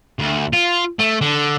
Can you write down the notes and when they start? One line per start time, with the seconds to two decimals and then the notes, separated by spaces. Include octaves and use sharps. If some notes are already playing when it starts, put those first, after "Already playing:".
0.19 D2
0.53 F4
0.99 A3
1.21 D3